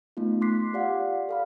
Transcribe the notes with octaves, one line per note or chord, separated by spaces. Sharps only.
A3 B3 D#4 F4
C6 D6 F#6 B6 C7
F4 G4 D5 F5 F#5
A4 F5 B5